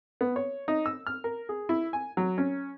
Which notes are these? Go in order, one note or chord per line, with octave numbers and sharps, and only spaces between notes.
B3
C#5
D#4
E6
F6
A#4
G#4
E4
G#5
F#3
C#4